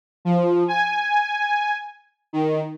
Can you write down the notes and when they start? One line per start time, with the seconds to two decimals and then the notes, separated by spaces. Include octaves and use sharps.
0.25 F3
0.68 G#5
2.33 D#3